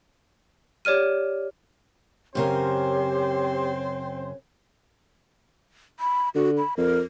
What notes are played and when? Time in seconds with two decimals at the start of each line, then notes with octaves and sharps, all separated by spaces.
0.85 G4 C#5 D5 F6 D#7
2.35 F#2 C#3 C4 G4 A#4 C5 C#5
6.00 B5
6.35 D3 F#4
6.58 B5
6.77 F2 A#4